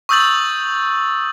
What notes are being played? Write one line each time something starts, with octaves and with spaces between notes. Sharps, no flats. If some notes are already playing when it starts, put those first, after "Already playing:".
C#6 D#6 E6 G6 A6 F#7